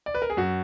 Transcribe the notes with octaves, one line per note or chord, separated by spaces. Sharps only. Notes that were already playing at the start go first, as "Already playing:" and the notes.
D5
B4
A#4
G#4
F#2 F#4